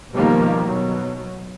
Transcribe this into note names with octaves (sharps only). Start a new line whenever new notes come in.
B2 D#3 F3 G3 A#3
B2 F#3